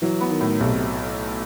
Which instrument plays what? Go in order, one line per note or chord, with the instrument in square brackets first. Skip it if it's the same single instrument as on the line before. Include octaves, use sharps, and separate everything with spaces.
[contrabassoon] E3 [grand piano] F#3
[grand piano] B3
[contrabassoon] D#3
[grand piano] A2
[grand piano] B1 [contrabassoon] C3